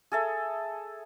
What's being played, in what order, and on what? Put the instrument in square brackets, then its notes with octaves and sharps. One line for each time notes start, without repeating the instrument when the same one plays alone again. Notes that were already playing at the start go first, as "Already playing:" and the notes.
[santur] G#4 A4 E5